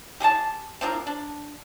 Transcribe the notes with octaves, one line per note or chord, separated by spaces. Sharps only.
G4 G#4 F#5 A5
C4 D4 F4 A#4
D4